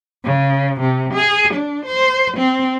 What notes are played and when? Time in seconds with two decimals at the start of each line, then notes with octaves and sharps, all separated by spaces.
0.24 C#3
0.81 C3
1.14 G#4
1.54 D4
1.85 C5
2.37 C4